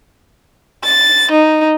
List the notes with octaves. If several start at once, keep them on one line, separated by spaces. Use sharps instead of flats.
A6
D#4